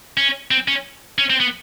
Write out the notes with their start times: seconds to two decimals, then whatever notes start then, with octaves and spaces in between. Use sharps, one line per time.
0.17 C#4
0.51 C4
0.68 C#4
1.18 C#4
1.30 C4
1.40 B3